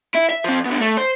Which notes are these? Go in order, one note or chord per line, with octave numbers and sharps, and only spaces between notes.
E4
E5
F3 C4
B2 D3
A3
C5